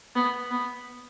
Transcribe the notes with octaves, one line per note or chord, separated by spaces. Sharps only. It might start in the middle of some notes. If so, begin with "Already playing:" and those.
B3
B3